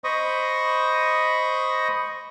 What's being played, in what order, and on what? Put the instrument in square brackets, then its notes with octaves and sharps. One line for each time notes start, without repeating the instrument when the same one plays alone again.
[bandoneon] C5 D#5 B5 C#6 D#6